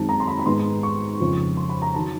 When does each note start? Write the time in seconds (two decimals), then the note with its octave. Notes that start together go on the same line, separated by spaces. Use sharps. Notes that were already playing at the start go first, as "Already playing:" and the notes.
Already playing: F#2 D#3 G#3 C4 D#4 A5
0.09 A#5
0.20 C6
0.28 B5
0.39 B5
0.46 G#2 D#3 G#3 B3 D#4 C6
0.83 C#6
1.20 F2 C#3 F3
1.57 C6
1.69 B5
1.82 A#5
1.94 D#3 F#3 A5